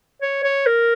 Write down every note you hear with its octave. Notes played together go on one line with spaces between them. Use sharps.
C#5
C#5
A#4